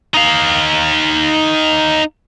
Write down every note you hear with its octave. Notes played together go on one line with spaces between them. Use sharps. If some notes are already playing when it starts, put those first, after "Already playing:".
D#4 F5